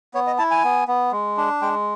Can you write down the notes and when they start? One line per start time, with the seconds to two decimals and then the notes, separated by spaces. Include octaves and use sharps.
0.14 B3 C#5
0.27 D#5
0.38 E4 A5
0.51 G#5
0.64 B3
0.88 B3
1.12 G#3
1.37 D4
1.62 G#3 G5